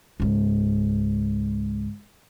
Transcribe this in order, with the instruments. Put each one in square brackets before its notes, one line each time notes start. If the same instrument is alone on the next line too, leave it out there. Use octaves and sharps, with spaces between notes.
[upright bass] C#2 G#2